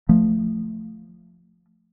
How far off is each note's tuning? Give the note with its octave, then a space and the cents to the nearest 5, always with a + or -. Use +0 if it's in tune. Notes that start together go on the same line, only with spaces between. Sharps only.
F3 +5 A3 +0